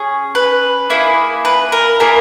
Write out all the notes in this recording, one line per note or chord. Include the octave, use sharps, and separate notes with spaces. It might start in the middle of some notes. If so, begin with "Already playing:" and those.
Already playing: C#4 G#4
B4
A#3 E4 G#4
B4
A#4
A#3 E4 G#4 A#4